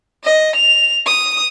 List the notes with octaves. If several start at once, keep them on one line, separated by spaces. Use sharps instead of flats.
D#5
F7
D#6